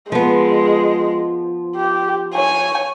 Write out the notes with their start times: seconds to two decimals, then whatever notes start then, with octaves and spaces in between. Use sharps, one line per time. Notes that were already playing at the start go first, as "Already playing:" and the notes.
0.12 F3 G#3 B3
1.76 G4
2.34 C#5 G#5